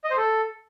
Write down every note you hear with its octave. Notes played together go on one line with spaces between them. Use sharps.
D#5
C5
A4